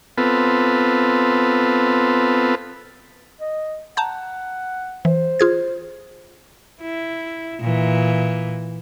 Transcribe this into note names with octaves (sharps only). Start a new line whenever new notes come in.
B3 C4 F4 A4 B4
D#5
F#5 A5 A#5 G6
E3 C5
F4 G#4 G#6
E4
A#2 E3